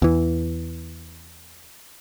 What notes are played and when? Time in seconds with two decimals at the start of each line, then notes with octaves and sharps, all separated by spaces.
0.02 E2 E3